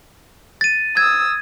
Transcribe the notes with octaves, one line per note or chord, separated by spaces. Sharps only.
A6 D#7
D#6 E6 G#6